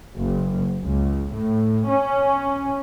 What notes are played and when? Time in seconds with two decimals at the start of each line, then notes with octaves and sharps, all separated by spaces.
0.16 F#1
0.81 C#2
1.34 A2
1.87 C#4